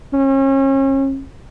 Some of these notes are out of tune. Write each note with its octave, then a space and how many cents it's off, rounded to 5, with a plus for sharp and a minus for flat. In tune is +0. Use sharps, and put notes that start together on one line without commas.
C#4 -35